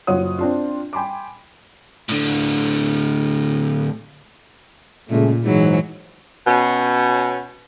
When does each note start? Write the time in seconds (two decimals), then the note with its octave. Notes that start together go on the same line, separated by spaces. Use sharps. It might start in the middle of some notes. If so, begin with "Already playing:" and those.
0.07 F#1 F#3 F4 C#5 F#5 D#6
0.38 C4 D4 F4
0.93 G5 G#5 B5 C6 D6
2.09 A2 D3
5.09 A#2 C#3 G#3 A3
5.44 G#2 E3 F#3
6.47 B2 C#4